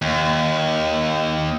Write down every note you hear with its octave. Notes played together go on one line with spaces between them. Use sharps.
D#2